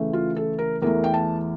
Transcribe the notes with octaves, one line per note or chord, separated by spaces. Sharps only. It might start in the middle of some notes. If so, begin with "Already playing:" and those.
Already playing: C#3 E3 A3
F4
A4
A#4
E2 E3 A3 A#4
G5
A5